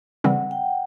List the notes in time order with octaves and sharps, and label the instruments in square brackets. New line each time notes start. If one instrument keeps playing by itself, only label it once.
[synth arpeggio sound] C#3 E3 G3 C4 [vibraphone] F#5
[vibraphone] G5